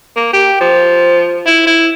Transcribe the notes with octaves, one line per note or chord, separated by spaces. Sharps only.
A#3
G4
F3
E4
E4